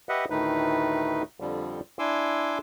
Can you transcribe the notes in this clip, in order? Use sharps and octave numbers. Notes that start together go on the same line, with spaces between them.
G4 B4 D#5 E5 F#5
D2 A2 D#3 A3 D#4 B4
F2 D3 F3 G3
D4 E4 G#5 C6 D6 E6